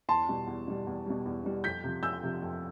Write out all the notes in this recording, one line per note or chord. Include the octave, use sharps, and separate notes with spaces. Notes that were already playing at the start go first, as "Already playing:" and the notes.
E2 A5 C6
B2 G3
E2
B2 G3
E2
B2 G3
E2
B2 G3
F2 G6 B6
C3 F3
F2 E6 G6
C3 F3
F2